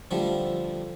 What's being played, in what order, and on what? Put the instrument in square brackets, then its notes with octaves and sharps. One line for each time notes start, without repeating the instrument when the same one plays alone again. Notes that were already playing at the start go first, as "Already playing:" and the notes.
[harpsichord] D3 F3 G3 A3